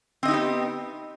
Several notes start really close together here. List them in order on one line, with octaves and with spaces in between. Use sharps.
C4 D#5 D#4 G4 B3